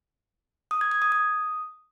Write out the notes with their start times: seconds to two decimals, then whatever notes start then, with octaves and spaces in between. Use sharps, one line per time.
0.71 D#6
0.81 G#6
0.91 G#6
1.02 D#6
1.12 D#6